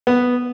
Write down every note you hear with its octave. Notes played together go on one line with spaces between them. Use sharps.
B3